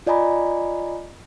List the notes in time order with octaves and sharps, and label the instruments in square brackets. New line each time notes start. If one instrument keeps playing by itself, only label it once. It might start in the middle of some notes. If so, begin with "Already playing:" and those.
[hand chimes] F4 D5 D#5 G#5 A#5 B5